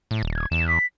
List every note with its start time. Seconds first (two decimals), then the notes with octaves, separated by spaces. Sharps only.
0.11 A2
0.23 D#1
0.35 G#6
0.51 E2 E7
0.68 B6